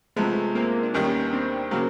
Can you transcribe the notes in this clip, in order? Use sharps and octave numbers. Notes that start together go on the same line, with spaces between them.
C3 F3 G#3 A3 B3
A#3 C4
D4
D#2 D#3 G3 B3 C#4
C4 D4
C#3 F#3 A#3 C4